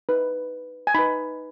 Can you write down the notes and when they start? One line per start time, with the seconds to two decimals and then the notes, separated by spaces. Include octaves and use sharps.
0.09 D#4 B4
0.87 G#5
0.95 D#4 B4 B5